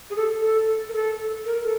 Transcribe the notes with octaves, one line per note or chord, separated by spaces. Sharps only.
G#4
A4
A4
A#4
A4
A#4
A4